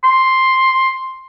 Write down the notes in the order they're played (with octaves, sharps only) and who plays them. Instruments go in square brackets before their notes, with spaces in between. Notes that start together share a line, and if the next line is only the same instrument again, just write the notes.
[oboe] C6